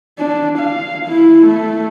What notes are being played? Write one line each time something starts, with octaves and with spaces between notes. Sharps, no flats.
D4
F5
E4
A3